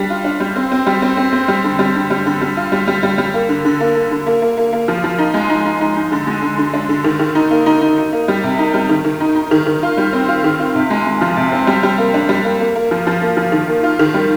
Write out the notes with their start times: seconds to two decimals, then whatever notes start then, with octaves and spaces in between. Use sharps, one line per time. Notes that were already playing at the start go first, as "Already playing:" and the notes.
Already playing: G3 D4
0.10 F4
0.24 D4
0.40 G3
0.56 C4
0.71 C4
0.86 G3
1.02 C4
1.17 C4
1.33 C4
1.48 G3
1.64 D3
1.79 G3
1.95 D3
2.10 G3
2.26 D3
2.41 G3
2.57 F4
2.72 G3
2.88 G3
3.03 G3
3.18 G3
3.34 A#3
3.49 D3
3.65 D3
3.80 A#3
3.95 A#3
4.11 D3
4.26 A#3
4.42 A#3
4.57 A#3
4.73 A#3
4.88 F3
5.04 F3
5.18 D#4
5.34 G#3
5.50 D#4
5.65 D#4
5.81 D#4
5.96 D#4
6.12 D3
6.27 G#3
6.42 D3
6.58 D3
6.73 D4
6.89 D3
7.04 D#3
7.20 D#3
7.35 D#4
7.51 A#3
7.66 D#4
7.81 D#4
7.97 D#4
8.12 A#3
8.28 G3
8.43 C3
8.58 D#4
8.74 G3
8.89 D#3
9.05 D#3
9.20 D#4
9.35 D#4
9.51 D#3
9.66 D#3
9.83 F4
9.97 G3
10.13 C4
10.28 F4
10.44 D#3
10.59 F4
10.75 C3
10.90 G#3
11.06 G#3
11.21 F3
11.37 C3
11.52 C4
11.67 G3
11.83 G3
11.98 A#3
12.14 D4
12.29 G3
12.45 A#3
12.60 A#3
12.75 A#3
12.91 F3
13.07 F3
13.22 A#3
13.37 F3
13.52 D#3
13.68 A#3
13.83 F4
13.99 D#3
14.14 G3